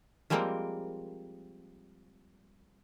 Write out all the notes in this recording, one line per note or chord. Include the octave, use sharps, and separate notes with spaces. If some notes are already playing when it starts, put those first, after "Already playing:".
F3 G3 G#3 A#3 C4 A#4